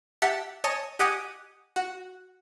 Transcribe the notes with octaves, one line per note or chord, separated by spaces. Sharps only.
G4 E5 F#5 A5
C#5 D#5 G#5 A5 D#6
G4 D#5 F#5 G#5 D6 D#6
F#4